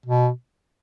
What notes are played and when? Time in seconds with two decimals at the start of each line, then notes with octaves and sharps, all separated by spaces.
0.06 B2